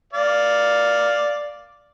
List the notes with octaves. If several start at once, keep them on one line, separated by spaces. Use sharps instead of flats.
D5 F5